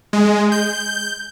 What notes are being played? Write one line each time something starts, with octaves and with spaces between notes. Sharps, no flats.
G#3
G6